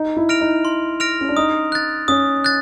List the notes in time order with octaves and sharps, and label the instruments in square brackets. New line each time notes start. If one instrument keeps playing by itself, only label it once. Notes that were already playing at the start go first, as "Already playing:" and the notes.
Already playing: [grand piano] D#4
E4
[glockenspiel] F6 A#6 D7 F7
[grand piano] D#4
[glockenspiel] C6
F6 A#6 D7 F7
[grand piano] C#4
D4
[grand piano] D#4 [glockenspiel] D#6
[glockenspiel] F#6 A6
[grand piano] C#4 [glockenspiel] D#6
[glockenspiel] F#6 A6